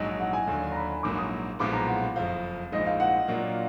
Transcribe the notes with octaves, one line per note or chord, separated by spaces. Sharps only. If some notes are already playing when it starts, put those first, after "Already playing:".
Already playing: A#1 G#2 F#3 D#5
F#5
G#5
D#2 D3 F#3 D4
A#5
B5
A#1 G#2 F#3 A#3 D6
D#6
B1 A#2 F3 G#3 B3 D6
A#5
F#5
F#1 F2 F3 F5
A#1 G#2 F3 G#3 D#4 D#5
F5
F#5
A#2 F#3 A#3 D4 F4